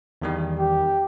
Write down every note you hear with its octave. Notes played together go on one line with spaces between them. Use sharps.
E2 D#3 G3
G4